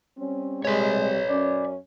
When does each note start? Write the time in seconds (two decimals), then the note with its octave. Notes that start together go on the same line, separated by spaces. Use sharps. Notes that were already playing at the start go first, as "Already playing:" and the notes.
0.17 G3 C4 C#4
0.65 C3 G3 G#3 B4 C#5
1.29 F#2 C#4 D5